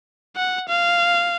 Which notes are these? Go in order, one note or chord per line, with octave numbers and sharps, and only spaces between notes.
F#5
F5